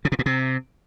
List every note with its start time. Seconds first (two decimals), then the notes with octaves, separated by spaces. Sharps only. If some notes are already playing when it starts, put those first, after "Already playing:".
0.05 C#3
0.12 B2
0.19 A#2
0.26 C3